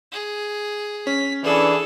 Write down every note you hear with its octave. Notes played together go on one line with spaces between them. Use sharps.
G#4
C#4 B6
E3 D4 G#4 A4